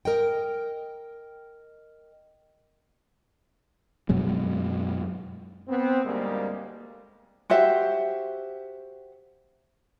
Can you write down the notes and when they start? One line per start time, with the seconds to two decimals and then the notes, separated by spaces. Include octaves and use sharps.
0.05 A#4 D#5 G5
4.09 F#2 B2 F#3 G#3
5.68 B3 C4
6.04 D2 G#2 G3 G#3 A#3
7.50 F#4 G4 C5 E5